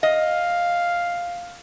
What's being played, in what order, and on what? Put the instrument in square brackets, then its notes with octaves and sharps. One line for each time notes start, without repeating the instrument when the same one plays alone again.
[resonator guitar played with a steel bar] D#5 [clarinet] F5